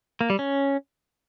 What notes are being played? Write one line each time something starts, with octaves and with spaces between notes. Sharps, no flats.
A#3
G3
C#4